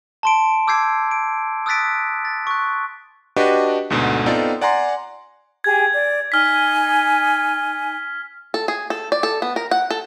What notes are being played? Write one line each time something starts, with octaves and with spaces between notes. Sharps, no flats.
A5 C6 D7
D6 E6 G6 G#6 C7 D7
D7
D#6 E6 F#6 A6 B6 D7
A6
C#6 F#6
D4 F#4 G4 B4 D#5
D2 G#2 B2 D3
B3 C4 D#4 F4 A4 D5
D5 F#5 G#5 A#5 C6
G4 G#4 G#5 G#6
D5
D#4 G#5 F6 B6
A4
G#4
A4
D5
A4
B3
A#4
F#5
A4